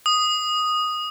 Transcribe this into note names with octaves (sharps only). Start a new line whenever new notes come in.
D#6